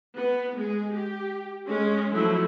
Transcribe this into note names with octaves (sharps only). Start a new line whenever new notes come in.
B3
G#3 G#4
G4
G#3 C#4
F3 F#3 A3 E4